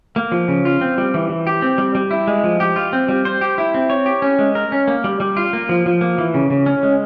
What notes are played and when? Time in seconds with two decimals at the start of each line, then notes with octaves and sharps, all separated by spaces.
0.16 A#3
0.32 F3
0.48 C#3
0.65 F4
0.81 C4
0.98 G3
1.14 E3
1.29 E3
1.47 G4
1.62 C4
1.78 G3
1.95 G3
2.11 E4
2.27 G#3
2.44 F3
2.60 G4
2.76 F4
2.93 C4
3.09 G3
3.25 C5
3.41 G4
3.58 E4
3.74 C4
3.90 C#5
4.06 G4
4.22 C#4
4.39 G#3
4.55 A#4
4.72 C#4
4.88 A#3
5.04 G3
5.20 G3
5.37 F4
5.53 A#3
5.69 F3
5.86 F3
6.01 A#3
6.18 E3
6.34 C#3
6.50 C#3
6.66 C#4
6.83 G#3